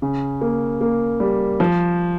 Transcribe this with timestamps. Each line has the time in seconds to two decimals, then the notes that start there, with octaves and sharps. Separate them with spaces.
0.02 C#3
0.41 A#3
0.81 A#3
1.20 G3
1.60 F3